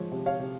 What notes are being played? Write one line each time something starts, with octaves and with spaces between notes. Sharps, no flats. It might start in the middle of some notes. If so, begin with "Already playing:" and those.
Already playing: F3 G#3 C#5
C3
C#5 F5
C3